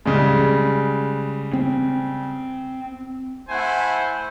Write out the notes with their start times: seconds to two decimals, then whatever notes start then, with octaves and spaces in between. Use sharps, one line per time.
0.05 C#3 G3 G#3
1.53 C4
3.50 A3 E4 C5 F#5 G#5